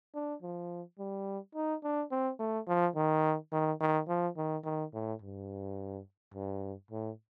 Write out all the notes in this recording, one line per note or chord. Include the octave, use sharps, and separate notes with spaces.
D4
F3
G3
D#4
D4
C4
A3
F3
D#3
D#3
D#3
F3
D#3
D#3
A2
G2
G2
A2